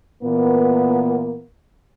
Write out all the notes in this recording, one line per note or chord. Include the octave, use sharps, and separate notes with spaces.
A#2 E3 A#3 B3